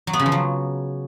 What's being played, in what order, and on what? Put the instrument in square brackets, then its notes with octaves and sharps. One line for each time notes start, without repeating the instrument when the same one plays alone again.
[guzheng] F#3
B3
C#3
F3
F#3